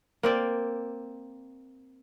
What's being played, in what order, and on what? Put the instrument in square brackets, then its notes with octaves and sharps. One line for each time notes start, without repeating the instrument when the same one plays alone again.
[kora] A#3 C4 D5